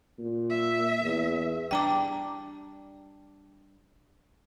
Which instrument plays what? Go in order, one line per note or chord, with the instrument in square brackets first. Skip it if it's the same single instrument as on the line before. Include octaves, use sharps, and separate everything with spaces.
[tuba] A#2
[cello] E5
[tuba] E2
[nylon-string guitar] G3 D4 [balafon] G5 A#5 D6